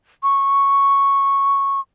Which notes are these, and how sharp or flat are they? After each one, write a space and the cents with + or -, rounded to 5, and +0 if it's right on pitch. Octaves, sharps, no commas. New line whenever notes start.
C#6 -5